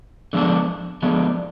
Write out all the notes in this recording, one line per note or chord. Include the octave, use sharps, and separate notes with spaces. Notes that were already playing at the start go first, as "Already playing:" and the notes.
D3 F3 G#3 B3 D4
D3 F3 G#3 B3 D4